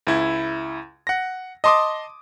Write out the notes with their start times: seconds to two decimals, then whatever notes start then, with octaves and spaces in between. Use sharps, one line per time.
0.07 C#2 E4 G#6
1.07 F#5 A#6
1.64 D#5 A5 C6 D6 D#6